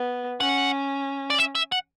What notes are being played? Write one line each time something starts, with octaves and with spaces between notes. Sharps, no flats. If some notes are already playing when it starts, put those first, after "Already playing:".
Already playing: B3
C#4 F#5
D5
E5
E5
F#5